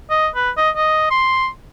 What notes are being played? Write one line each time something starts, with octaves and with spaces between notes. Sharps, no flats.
D#5
B4
D#5
D#5
C6